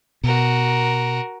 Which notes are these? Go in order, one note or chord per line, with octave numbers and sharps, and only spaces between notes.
B2 F#4 A#4